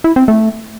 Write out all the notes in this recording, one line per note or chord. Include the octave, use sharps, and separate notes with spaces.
E4
C4
A3